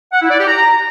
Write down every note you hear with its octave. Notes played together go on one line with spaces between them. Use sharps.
F#5
E4
D5
G4
A#5